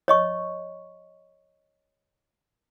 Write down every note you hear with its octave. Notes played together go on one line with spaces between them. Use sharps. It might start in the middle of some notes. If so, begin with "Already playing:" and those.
C#5 D#5 C#6